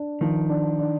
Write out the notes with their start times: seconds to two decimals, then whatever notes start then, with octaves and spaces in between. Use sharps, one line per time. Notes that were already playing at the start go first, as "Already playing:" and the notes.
Already playing: D4
0.21 D#3 F3
0.49 D4
0.79 D4